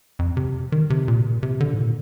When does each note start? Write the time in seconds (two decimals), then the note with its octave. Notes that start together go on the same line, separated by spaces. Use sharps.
0.19 F2
0.37 C3
0.72 D#3
0.90 C3
1.08 A#2
1.21 C3
1.26 A#2
1.43 C3
1.60 D3
1.74 G#2
1.78 A#2